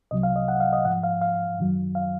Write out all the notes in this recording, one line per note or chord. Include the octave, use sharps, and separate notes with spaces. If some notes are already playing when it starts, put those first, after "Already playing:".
C2 C3 F#3 D#5
F5
D#5
F#5
F5
D#5
G#2 F3 F#5
F5
F5
F#2 D#3 F#3
F5